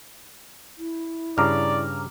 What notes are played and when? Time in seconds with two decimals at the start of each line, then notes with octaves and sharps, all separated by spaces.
0.78 E4
1.38 G2 C#3 D5 A#5 D6 F6